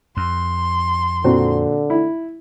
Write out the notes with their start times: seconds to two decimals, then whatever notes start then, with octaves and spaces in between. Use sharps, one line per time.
0.17 F2 C6
1.24 A#2 D3 C4 F#4
1.90 E4